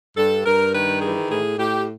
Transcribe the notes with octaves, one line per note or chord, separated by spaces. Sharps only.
G2 A4
G2 A#4
D#3 B4
E3 G#4
A2 G#4
A2 G4